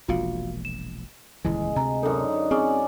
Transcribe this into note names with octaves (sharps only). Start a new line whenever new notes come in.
E1 A#1 A#2 F4 F#4 F5
E7
D#1 C#2 E3 G#3 E4
D2 C3 D#5 A#5
F#2 D3 D#4 A4 A#4
C4 C#4 G#4 D5 D#6